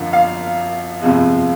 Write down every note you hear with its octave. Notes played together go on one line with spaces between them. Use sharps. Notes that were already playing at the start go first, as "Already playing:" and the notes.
Already playing: G#1 F#2 D3 F3 A#3
F5
G1 F2 C3 F3 G#3